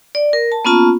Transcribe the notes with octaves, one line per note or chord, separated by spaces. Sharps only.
D5
A#4
A5
A#3 B3 C#4 F4 A5